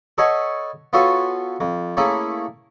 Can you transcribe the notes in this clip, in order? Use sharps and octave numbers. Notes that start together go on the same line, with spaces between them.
A4 B4 C#5 D#5 F#5 G#5
B3 F4 F#4 A4 C#5 G#5
F2
A3 A#3 C#4 E4 G#4